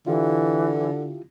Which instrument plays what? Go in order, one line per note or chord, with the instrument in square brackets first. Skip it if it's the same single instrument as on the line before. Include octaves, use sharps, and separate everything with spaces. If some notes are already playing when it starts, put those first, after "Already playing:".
[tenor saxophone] D3 [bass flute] E3 [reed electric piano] E4 F4 G4